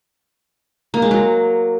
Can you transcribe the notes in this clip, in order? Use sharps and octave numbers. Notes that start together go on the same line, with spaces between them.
A#3
G#3
F#3